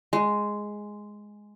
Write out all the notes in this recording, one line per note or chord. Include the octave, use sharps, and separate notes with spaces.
G#3